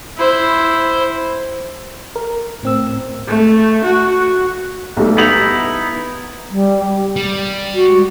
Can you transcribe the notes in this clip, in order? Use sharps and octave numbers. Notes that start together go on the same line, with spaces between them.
E4 C5
A#4
A2 C4 E6
A3
F#4
B1 G3 A3
B3 D#4 E4 F7 F#7
G3
G3
F#4